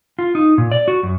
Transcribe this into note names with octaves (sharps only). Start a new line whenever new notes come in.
F4
D#4
A#2
D5
F#4
F#2